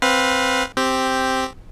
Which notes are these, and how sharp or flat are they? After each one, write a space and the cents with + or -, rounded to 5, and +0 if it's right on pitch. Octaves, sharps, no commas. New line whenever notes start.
C4 +0 B4 +0 F5 +25
C4 +0 G4 +0